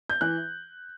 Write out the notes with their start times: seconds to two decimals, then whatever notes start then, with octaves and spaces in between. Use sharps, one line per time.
0.09 G6
0.21 E3 F#6